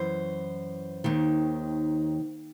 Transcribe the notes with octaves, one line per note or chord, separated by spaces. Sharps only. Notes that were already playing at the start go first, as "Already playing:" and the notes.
Already playing: F#2 E3 C5
D#2 D#3